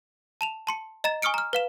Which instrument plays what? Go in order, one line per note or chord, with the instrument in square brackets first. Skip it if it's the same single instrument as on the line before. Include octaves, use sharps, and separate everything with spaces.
[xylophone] A5 E7 F7
A5 C6 C#7
D#5 A#5 A6 E7
G#5 C#6 D#6 F6 C#7 D7
A#5 F6
B4 F5 E7